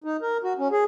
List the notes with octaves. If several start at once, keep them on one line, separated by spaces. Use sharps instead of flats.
D#4
A#4
F#4
C#4
G#4